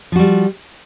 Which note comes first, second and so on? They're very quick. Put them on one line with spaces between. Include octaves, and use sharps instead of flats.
F3 F#4 G3